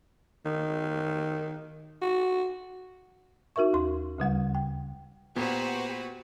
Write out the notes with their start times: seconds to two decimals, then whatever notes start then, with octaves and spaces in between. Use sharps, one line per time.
0.45 D#3
2.02 F#4
3.56 D#4 F#4 A#4 E5 C#6
3.73 D#2 C6
4.18 D2 C#3 G3 F#5
4.55 G5
5.36 A#2 B3 F#4 G4 B4 C5 F#5